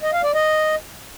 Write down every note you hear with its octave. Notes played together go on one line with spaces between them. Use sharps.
D#5
F5
D5
D#5